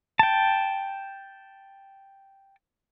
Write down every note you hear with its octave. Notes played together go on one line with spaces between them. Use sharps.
G5 A5